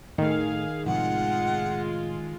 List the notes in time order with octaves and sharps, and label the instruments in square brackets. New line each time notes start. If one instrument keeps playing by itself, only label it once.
[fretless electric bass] A2 A3 [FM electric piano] D#3 [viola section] G#4 F5
[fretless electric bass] A2 C3 F3 [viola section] G#3 F4 [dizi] F#5